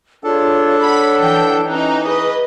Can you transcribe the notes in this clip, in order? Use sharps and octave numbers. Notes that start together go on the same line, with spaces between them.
D4 F4 G#4 A4 C#5
C#5 F#5 A5 B5
E3 G5
E3 C#4 D#4 F#6
G#4 B4 D#5 D#6